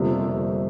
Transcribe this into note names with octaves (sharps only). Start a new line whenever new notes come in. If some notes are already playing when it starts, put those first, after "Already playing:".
Already playing: G1 F2 C3 G3 A#3